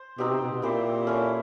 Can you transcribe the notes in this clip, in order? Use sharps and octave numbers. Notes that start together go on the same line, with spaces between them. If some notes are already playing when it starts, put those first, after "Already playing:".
Already playing: C5
B2 C4 D#4 G4
C3
B2
B2
A#2 C4 E4 G4 C5
A3 C#4 E4